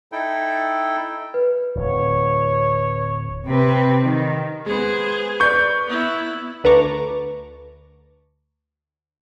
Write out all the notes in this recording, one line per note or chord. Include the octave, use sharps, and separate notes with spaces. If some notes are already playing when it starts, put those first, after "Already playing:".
D#4 E4 A4 G5
B4
D1 C#5
C3 C4 B4
D#3
G#3 B3 G#4 C5
B4 D5 C#6 G6
B3 E4
D2 B4 A5 A#5 C#6 D6